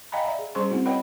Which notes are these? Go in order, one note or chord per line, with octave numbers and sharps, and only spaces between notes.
D#5 F5 G5 G#5 A#5 B5
D5 E5 A#5
G#4
G3 C#4 G#4 C5 C6 C#6
A3 C4 E4 F#4
B4 C#5 D#5 F#5 G5 B5